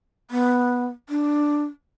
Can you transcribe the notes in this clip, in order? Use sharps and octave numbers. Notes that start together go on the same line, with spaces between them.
B3
D4